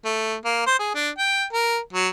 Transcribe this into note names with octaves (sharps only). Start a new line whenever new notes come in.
A3
A#3
C5
G#4
D4
G5
A#4
F#3